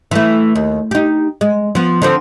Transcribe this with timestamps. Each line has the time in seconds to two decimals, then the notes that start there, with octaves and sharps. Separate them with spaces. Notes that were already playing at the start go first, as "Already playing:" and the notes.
0.11 E3 A3
0.55 D#2
0.91 D#4 G4
1.41 G#3
1.75 F3 B3
2.02 D3 F3 C4